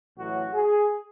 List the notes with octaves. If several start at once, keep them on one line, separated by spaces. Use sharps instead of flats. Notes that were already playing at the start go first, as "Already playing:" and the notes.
A1 A2 F#3 F#4
G#4